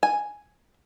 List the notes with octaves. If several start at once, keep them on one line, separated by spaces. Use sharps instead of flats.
G#5